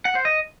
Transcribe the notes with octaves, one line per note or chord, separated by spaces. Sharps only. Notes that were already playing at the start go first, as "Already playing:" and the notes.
F#5
C5
D#5